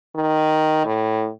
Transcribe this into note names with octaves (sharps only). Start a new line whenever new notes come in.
D#3
A2